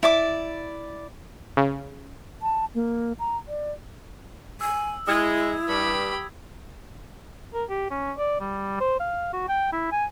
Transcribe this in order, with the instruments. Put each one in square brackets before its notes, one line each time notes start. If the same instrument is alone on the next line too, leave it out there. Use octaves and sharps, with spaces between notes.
[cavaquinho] E4 D5 D6
[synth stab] C#3
[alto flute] A5
A#3
A#5
D5
[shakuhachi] G#5 [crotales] E6
[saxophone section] G#3 [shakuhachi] E4 [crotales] D#6 G#6
[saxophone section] G2 [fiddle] G4 B5
[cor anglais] A#4
G4
C#4
D5
G3
C5
F5
F#4
G5
E4
G#5